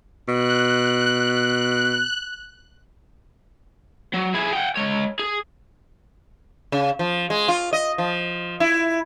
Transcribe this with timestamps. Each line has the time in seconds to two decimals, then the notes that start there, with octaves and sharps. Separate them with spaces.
0.28 B2 F#6
4.14 F#3
4.34 E4 G#4
4.53 F#5 G5
4.75 G#3 C#5
5.20 G#4
6.72 C#3
6.99 F3
7.30 G#3
7.48 F4
7.73 D#5
7.98 F3
8.60 E4